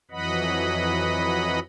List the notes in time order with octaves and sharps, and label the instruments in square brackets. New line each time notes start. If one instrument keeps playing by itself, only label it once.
[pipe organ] F2 E3 F#3 D#5 F#5 B5